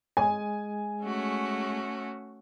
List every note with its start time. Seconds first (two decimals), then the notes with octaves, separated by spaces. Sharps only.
0.17 G#3 G#4 G#5
1.03 A3 C#4 F#4